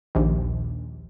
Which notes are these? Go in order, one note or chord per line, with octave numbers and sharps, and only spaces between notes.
A#1 D#2